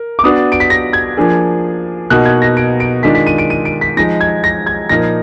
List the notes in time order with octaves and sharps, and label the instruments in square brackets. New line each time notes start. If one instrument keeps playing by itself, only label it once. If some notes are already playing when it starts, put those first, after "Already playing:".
Already playing: [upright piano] A#4
[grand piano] D6
[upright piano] B3 D4 F#4 D5 [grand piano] D#6
[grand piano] D7
B6
A#6
G#6
[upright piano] F3 A#3 D4 G#4
[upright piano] B2 A#3 D#4 F#4 [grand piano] F#6
[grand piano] G#6
A#6
D7
D7
[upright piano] D#3 G#3 D4 F4 [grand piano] B6
[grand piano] B6
D#7
D7
D#7
D7
B6
[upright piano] F3 G#3 D#4 [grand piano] A#6
[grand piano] G#6
A#6
G#6
[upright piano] A#2 F3 A#3 D#4 A#4 [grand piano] A#6